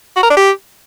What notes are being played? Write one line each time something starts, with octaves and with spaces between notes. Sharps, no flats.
F#4
A#4
D4
G4